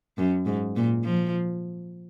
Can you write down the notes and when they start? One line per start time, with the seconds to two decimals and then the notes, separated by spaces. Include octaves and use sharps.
0.18 F#2
0.46 G#2
0.76 A#2
1.04 F3